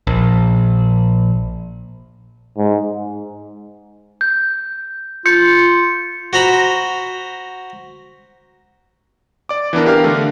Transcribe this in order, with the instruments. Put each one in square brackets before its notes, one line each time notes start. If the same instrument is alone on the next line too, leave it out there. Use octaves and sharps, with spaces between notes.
[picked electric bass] A#1
[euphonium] G#2
[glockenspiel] G6
[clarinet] F4 [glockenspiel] G6 C#7
[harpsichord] F#4 C5 A#5 B5
[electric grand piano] D5 D6
E3 B3 D4 A#4
G4 A#4 F5 F6
D3 A3